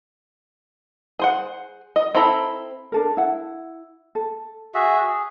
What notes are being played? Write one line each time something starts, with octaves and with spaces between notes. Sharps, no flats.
G#4 C5 F#5
D#5
C4 E4 A4 A#5 B5
D4 A4 A#4
E4 F#5
A4
F#4 G#4 E5
G#4